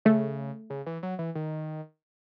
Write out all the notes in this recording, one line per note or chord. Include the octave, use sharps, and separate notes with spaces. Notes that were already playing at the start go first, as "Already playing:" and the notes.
C#3 A3
C#3
E3
F#3
E3
D#3